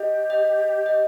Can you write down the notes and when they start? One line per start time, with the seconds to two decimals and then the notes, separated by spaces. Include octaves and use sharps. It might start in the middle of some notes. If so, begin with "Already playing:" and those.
Already playing: G4 D#5
0.30 D#5
0.86 D#5